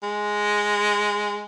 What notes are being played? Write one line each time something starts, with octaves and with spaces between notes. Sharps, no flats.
G#3